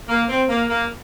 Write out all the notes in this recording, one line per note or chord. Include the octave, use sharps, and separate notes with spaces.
A#3
C4
A#3
A#3